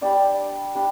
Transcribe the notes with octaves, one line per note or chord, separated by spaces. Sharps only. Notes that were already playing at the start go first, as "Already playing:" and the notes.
G3 D4 D5 G5
G3 D4